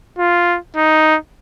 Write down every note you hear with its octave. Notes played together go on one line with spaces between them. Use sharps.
F4
D#4